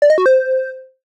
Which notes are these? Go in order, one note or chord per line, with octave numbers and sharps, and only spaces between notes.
D5
D#5
F#4
C5